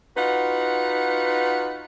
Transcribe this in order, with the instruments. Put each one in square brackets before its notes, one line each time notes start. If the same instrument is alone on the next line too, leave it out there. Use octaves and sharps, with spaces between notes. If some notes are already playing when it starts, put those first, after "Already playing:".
[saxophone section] D#4 F4 F#4 B4 F#5